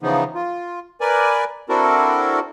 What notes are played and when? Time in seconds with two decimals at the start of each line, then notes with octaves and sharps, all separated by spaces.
0.03 C#3 E3 F3 B3 D#4
0.35 F4
1.01 A#4 B4 D5 G#5
1.69 C4 D4 E4 F#4 A4 A#4